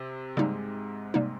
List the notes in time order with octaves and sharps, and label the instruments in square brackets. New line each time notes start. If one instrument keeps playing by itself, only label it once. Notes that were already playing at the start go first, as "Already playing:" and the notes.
Already playing: [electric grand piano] C3 C4
[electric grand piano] G#2 G#3 [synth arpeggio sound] C#3 G3 A#3 D#4
[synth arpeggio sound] C3 G3 A#3 D#4